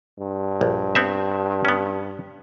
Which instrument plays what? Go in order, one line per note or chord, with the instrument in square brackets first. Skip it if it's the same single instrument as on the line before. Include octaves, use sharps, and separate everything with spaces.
[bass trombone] G2
[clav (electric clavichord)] A#1
B3 C4 E5
B3 C#4